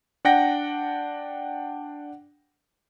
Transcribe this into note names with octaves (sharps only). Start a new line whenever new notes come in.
D4 F#5 G5 A#6